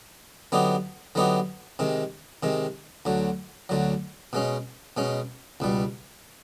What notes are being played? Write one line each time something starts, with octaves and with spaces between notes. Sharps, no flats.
D3 F#3 B3 D#4 G4
D3 F#3 B3 D#4 G4
C3 D#3 G#3
C3 D#3 G#3
D2 D3 F#3
D2 D3 F#3
B2 G#3 C#4
B2 G#3 C#4
C#2 B2 G3